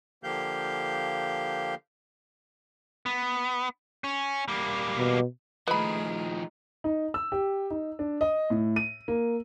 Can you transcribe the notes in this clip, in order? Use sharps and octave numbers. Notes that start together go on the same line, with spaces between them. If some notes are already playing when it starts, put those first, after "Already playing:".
D3 F3 A#3 G4 F5 G6
B3
C#4
G3 A#3
B2
D#3 F3 A3 G#4 B4 D#5 A#5 B5
D#4
E6
G4
D#4
D4
D#5
A2
D#7
A#3